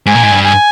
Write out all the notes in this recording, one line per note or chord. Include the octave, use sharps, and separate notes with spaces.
G#2 G#5
A#2
G#2
G2
G#5